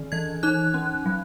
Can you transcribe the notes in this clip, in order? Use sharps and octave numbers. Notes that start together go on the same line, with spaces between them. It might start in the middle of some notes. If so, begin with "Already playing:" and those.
Already playing: D#3
E3 G#6
D#4 F#6
C#4
F#3